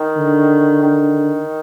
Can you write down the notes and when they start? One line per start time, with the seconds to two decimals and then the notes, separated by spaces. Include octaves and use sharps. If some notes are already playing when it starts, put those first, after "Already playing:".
Already playing: D#3
0.17 D3
0.83 D#3